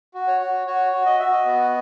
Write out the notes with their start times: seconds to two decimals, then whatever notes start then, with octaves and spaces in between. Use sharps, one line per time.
0.14 F#4
0.28 C#5
0.40 F#4
0.67 F#4 C#5
0.93 F#4
1.06 D#5
1.19 F#4 E5
1.32 D#5
1.46 B3